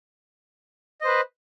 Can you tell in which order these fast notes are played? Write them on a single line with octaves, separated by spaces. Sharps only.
D#5 C5 B4